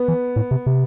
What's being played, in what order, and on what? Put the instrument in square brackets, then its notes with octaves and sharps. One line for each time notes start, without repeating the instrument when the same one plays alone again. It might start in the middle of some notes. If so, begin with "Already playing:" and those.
Already playing: [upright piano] B3
[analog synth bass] E3
A2
C3
C3